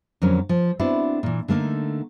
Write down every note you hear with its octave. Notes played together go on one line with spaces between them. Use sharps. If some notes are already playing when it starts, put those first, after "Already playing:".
F2 D3 F#3 C#4 A#4
F3
B3 C4 D4 E4 F#4
A#2 E3
D3 A3 A#3 D#4